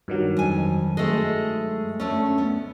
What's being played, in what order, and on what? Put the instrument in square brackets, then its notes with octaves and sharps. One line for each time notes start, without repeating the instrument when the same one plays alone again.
[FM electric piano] G2 D#3 F#3
[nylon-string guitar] F2 G#5
G#3 A3 C5
D2 A3 C#4
B3